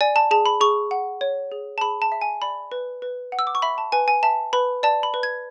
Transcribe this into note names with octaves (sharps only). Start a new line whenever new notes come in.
D5 G#5
A5
G#4 A5
B5
G#4 C#6
F#5
C#5
G#4
A5
G#4 B5
A5
E5
G#5
D5 B5
B4
B4
F#5
E6
D6
C#6
E5 B5
A5
B4 G#5
G#5
E5 A5
B4 B5
D5 A5
B5
B4
G#6